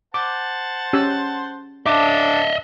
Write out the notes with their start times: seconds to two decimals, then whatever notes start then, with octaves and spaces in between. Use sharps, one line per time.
0.14 C5 F#5 A5 D6
0.93 C#4 G4 E6
1.86 C#4 D4 A4 D#5 E5 D6